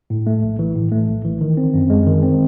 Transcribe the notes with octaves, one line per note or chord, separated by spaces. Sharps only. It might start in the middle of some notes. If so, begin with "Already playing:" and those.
A2
A3
A#1
E3
A2
A3
A#1
E3
D#3
C4
F#2
G#3
D#3
C4